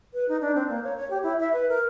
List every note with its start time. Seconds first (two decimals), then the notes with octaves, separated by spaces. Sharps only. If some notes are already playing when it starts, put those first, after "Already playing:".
0.14 B4
0.29 D#4
0.41 D4
0.55 C4
0.69 A#3
0.84 C#5
0.97 C#5
1.10 G4
1.23 E4
1.40 E5
1.53 B4
1.69 A#4